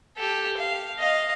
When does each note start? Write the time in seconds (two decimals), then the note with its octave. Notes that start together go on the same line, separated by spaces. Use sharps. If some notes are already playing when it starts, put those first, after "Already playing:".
0.18 G4 A4
0.57 F5
0.98 D#5 F5